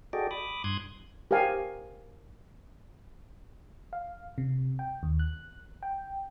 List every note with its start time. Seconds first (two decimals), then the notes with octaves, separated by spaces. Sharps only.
0.13 F#4 G#4 A4 D5 D#5 G5
0.31 B5 D6 D#6
0.64 G2 C6 D#6 F#6 G#6
1.31 G4 A#4 C5 F5 G#5
3.93 F5
4.38 C3
4.79 G5
5.03 D#2
5.19 F#6
5.83 G5